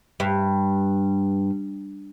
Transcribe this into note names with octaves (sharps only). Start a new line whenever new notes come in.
G2